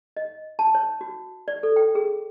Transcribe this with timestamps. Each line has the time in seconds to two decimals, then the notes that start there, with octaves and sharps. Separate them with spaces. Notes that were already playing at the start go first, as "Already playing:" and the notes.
0.17 D#5
0.59 A5
0.75 C#5
1.01 F#4
1.48 D5
1.63 A4
1.76 G5
1.95 G#4